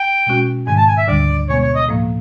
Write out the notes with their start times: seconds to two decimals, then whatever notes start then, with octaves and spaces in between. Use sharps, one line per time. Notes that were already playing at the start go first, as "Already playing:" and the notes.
Already playing: G5
0.26 B2 G#3 C#4 F#4
0.67 G#2 D#3 G#3 G#5
0.77 A5
0.87 G#5
0.98 E5
1.08 D2 D3 G3 D5
1.49 B2 G#3 B3 C#5
1.62 C#5
1.75 D#5
1.89 A2 F3 A#3